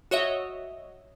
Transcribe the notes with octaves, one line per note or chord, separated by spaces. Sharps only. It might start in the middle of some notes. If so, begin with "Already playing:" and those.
F#4 C#5 D#5 E5